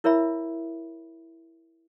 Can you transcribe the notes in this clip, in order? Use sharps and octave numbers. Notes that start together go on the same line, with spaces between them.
E4 A#4 C#5 E5 B5